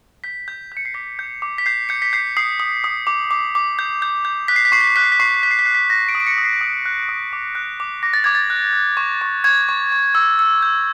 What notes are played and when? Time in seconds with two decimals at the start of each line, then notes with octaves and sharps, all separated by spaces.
0.24 G6 B6
0.48 G6
0.72 G6
0.77 C#7
0.85 C7
0.94 D6 B6
1.19 G6
1.42 D6
1.58 B6
1.66 G6 C7
1.89 G6 C#7
2.02 B6
2.13 G6 C7
2.37 D#6 C7
2.60 D#6
2.84 D#6
3.07 D6
3.31 D6
3.55 D6
3.79 G6
4.02 G6
4.25 G6
4.48 F#6 B6
4.56 C7
4.65 B6
4.72 C#6 C7
4.81 B6
4.87 C7
4.96 F#6 B6
5.04 C7
5.12 B6
5.20 C#6 C7
5.28 B6
5.34 C7
5.43 F#6 B6
5.51 C7
5.59 B6
5.66 F#6 C7
5.74 B6
5.90 F#6 A#6
6.09 D7
6.15 D#6
6.20 D7
6.27 C#7
6.38 D#6
6.44 C7
6.61 D#6
6.86 F#6
7.09 D#6
7.33 D6
7.55 F#6
7.80 D6
8.03 D6 A#6
8.14 A6
8.24 D6 G#6
8.35 A6
8.50 F#6
8.73 F#6
8.97 C#6
9.21 C#6
9.44 C#6 G#6
9.69 C#6
9.92 C#6
10.15 E6
10.39 E6
10.62 G6